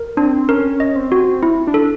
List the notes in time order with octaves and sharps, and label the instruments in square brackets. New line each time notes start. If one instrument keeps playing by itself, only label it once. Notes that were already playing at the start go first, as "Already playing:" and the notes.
Already playing: [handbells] A#4
[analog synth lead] C4 [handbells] D4
[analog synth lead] C#4 [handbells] A#4
[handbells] D#5
[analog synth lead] C4
[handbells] F#4
E4
[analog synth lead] D4
[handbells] A4